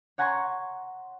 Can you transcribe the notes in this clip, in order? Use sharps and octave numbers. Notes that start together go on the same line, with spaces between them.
C#5 F#5 G#5 A#5 C6 C#6